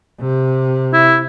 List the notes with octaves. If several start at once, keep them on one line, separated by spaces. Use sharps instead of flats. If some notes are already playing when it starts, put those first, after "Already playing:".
C3
E4